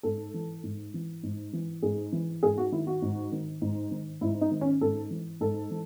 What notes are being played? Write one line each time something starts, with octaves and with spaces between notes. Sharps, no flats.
G#2 A4
E3
G#2
E3
G#2
E3
G#2 G#4
E3
G#2 G#4
F#4
D#3 E4
F#4
G#2
D#3
G#2
D#3
G#2 E4
D#4
D#3
C#4
G#2 A4
E3
G#2 A4
E3